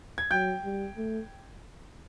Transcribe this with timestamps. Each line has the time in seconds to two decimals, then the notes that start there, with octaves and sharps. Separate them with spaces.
0.18 G#6
0.31 F#3 G5 G6
0.64 G3
0.97 A3